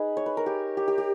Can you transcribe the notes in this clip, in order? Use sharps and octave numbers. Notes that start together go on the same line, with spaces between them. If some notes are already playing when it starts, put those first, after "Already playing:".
Already playing: D#4 G#4 B4
C#5
B4
A#4
G4
G4
G4
G4